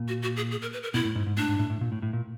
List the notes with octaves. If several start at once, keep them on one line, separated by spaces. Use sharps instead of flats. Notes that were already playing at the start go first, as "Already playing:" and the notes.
Already playing: A#2
F#4
F#4
G#4
G#4
A#4
B4
A#4
B2 E4
A2
G#2
G#2
A2 D4
G#2
A2
A2
A#2
A2
A2
A#2